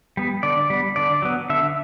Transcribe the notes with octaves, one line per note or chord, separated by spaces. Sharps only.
G3 B3
D3 D5
G3 B3
D3 D5
F#3 B3
D3 E5